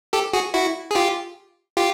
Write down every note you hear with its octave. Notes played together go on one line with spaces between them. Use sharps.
G4 A4
F#4 G#4
E4 F#4
G#4
F4 G4
F4 G4